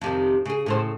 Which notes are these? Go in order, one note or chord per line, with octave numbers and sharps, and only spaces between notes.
F2 C3 D#3
C#3 G#4
A2 C#3 C5